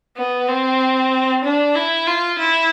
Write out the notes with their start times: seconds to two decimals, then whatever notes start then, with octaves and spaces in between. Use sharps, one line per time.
0.17 B3
0.49 C4
1.45 D4
1.75 E4
2.07 F4
2.39 E4